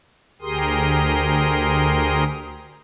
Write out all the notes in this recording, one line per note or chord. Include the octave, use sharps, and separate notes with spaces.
D2 G4 G#4 A#4 C6 D#6